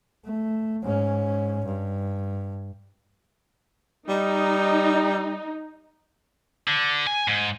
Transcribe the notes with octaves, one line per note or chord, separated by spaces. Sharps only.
A3
G#2 C#4
G2
G3 D#4
D3
G#5
G#2